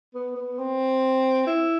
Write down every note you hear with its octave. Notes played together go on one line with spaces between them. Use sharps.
B3
B3
C4
E4